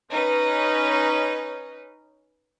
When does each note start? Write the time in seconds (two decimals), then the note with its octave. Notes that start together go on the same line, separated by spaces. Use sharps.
0.11 C#4 D#4 B4